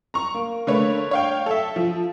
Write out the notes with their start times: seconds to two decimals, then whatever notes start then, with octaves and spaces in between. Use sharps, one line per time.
0.14 A#5 C#6
0.35 A#3
0.67 D3 A3 A#3 B4 C#5
1.11 C#5 F5 G5
1.46 A4 E5
1.76 F3